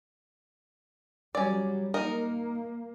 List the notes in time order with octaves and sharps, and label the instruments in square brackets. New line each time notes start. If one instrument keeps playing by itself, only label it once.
[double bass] F#3 G3 [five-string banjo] C#4 D5
[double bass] A#3 [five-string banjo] D#4 A#4